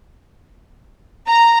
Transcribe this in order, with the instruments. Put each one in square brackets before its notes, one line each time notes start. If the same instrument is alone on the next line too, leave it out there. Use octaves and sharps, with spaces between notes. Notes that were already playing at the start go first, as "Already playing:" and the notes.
[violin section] A#5